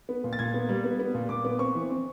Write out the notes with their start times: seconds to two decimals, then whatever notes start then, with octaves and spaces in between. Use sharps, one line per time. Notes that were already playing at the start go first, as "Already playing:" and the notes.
0.09 B3
0.24 A#2
0.33 A6
0.39 A#2 G#6
0.54 B3
0.69 G3
0.84 B3
0.99 B3
1.14 A#2
1.29 A#2 D6
1.45 B3
1.59 C4 C#6
1.75 E3
1.90 C4